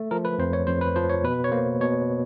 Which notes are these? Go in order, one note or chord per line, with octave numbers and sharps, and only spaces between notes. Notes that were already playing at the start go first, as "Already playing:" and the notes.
Already playing: A3
F3 A#4
B4
F2 C5
C#5
F2 C5
B4
F3 C5
C#5
B2 B4
C#5
A#3 C5
B2 C#5